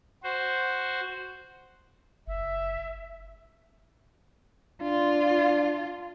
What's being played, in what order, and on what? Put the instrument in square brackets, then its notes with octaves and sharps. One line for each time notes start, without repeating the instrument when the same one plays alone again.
[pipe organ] F#4 C5
[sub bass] F#1 [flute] E5
[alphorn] D4 [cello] F4